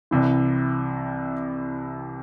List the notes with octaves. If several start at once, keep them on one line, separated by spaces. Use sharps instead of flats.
C2 C3 E3